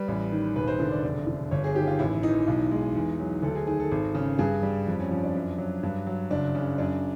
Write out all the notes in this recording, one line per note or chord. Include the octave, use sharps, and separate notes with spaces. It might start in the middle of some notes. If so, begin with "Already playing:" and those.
Already playing: G3 B4
A1
D#3
E1 B4
C5
D3
D5
F1 D5
D3
G1 C#5
G#4
D#3 G4
F4
A1 E4
E3 D#4
B1
G#3
E2
F#3
D2 A4
G#4
D#3 G#4
A4
G#1
C#3
G2 G#4
G3
F2
C#4
F3 C#4
D4
F#2
F#3
G2
F#3
F#1 D4
C#3
F#2 D4